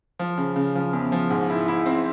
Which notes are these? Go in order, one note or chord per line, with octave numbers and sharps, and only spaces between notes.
F3
C#3
C#3
F3
E2
F3
G#2
E4
E4
C4